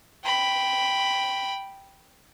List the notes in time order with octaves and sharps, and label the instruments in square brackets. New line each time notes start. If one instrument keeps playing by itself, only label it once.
[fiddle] G5 B5